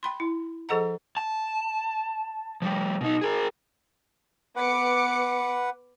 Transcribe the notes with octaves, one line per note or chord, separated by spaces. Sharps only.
G5 B5 C6
E4
F3 G#4 A4 D#5 F#5 A#5
A5
F3 G3
B2 D#4
G#4 A#4
B3 B4 F#5 D6 C#7